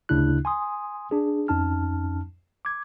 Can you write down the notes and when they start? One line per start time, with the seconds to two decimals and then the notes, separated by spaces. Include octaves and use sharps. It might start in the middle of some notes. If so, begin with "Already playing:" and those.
0.09 D2 C#3 D4 E4 F#6
0.45 G#5 C6 D#6
1.11 D4 G#4
1.48 F2 C#4 D#4 A5 F6
2.65 D6 G#6